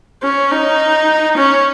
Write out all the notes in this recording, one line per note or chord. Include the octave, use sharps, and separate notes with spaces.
C#4
D#4
C#4